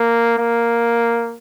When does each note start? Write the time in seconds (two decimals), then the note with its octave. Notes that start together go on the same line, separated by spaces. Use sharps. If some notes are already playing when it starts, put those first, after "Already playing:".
Already playing: A#3
0.38 A#3